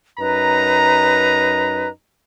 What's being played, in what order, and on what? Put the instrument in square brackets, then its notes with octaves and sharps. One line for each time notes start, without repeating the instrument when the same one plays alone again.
[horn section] F#2 D#4 A#5 [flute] B4